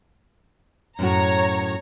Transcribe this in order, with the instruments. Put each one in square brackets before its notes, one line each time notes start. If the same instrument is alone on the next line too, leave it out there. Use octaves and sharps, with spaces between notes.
[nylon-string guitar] F#2 A2 F#4 [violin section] C#5 A#5